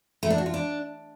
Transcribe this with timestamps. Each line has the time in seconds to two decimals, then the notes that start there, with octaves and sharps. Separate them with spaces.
0.23 A3
0.30 D4
0.38 F#4
0.46 F4
0.54 D4